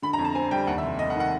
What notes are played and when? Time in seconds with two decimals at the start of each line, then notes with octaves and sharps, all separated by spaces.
0.02 D3 B5
0.13 A#5
0.18 F2
0.25 A5
0.35 C4 G#5
0.51 G3 G5
0.67 D#2 F#5
0.78 E5
0.83 F1
0.99 F1 D#5
1.10 F#5
1.15 D#3
1.20 F#5